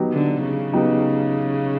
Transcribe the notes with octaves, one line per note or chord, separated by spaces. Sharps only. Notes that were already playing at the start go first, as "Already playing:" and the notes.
Already playing: F#3 B3 D#4 G4
D3
C#3
F#3 B3 D#4 G4